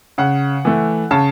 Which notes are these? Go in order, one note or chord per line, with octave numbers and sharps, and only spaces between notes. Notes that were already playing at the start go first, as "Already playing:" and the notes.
C#3 F#5
E3 A3
C#3 A5